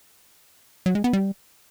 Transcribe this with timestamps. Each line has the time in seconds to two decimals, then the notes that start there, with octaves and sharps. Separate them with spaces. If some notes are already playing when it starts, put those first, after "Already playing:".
0.86 F#3
0.95 G#3
1.04 B3
1.13 G3